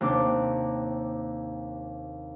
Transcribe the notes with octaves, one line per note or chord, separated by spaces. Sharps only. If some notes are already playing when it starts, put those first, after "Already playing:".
D#2 C3 D4 D6